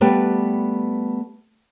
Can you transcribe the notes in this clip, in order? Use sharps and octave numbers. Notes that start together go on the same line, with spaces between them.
G3 A3 B3 B4 G5